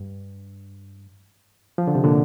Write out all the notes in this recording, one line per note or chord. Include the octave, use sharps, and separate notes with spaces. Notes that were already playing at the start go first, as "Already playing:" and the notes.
Already playing: G2
F3
D3
C3
A#2 D3